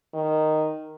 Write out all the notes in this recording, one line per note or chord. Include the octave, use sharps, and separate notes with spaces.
D#3